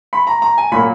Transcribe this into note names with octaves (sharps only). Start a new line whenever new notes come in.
B5
A#5
A#5
G#5
A#2 F#3 A#3 B5